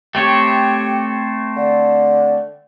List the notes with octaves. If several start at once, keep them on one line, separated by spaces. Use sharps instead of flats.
A3 C4 G4 C#5
D3